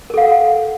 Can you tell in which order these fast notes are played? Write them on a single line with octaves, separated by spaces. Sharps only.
A#4 A4 F5 F#5